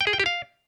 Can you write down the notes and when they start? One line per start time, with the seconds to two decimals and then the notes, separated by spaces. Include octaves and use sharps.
0.01 G5
0.07 G#4
0.13 G5
0.20 G4
0.26 F5